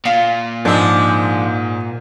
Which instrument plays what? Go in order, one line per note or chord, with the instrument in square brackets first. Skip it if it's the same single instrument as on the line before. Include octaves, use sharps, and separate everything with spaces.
[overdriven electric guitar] A#2 [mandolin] F4
[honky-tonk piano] G#2 [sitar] F3 G#3 D4 [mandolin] D6 E6